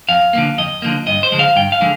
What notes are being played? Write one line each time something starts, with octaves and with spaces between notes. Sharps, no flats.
F2 F5
D3 F3 A#3
F2 D#5
D3 F3 A#3
G2 D#5
C5
D3 F3 G#3
F5
G2 G5
F5
D3 F3 G#3